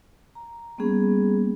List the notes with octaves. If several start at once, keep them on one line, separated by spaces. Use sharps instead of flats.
A#5
G3 A#3 B3 C#4 G#4